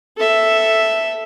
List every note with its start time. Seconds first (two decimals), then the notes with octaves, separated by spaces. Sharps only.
0.17 A4 E5